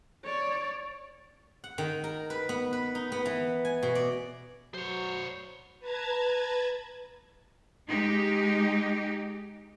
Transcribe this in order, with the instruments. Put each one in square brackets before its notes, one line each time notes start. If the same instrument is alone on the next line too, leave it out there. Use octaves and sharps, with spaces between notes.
[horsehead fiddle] C#5 D5
[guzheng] F#5
D#3
A#4
B4
B3
B4
D#4
B3
E3
G#5
B2
D5
[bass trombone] F#3 [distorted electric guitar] C5 C#5
[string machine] B4 A5 A#5 G#6 A6
[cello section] G#3 D#4 G4